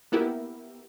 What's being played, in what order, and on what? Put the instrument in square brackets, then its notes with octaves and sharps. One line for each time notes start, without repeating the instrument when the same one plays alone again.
[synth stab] A#3 B3 E4 G4 A#4